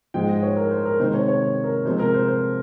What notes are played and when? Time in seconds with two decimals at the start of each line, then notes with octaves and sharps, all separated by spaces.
0.14 G#2 F3 G#3 G5
0.28 D#5
0.43 C#5
0.57 A#4
0.71 C5
0.86 A#4
1.00 C3 D#3 G#3 C5
1.14 C#5
1.28 C#5
1.64 A#4
1.85 C3 F3 G#3 C5
1.99 A#4
2.14 C5
2.28 C5